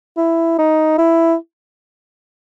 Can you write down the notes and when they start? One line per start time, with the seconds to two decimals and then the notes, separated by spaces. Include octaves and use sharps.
0.17 E4
0.58 D#4
0.98 E4